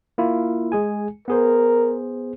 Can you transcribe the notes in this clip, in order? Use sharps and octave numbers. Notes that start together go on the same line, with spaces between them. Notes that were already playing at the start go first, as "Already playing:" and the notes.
A#3 E4 F4
G#3 G#4 G#5
B3 G#4 A#4 C5